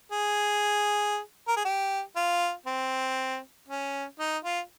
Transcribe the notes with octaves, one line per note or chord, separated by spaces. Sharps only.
G#4
A#4
G#4
G4
F4
C4
C#4
D#4
F4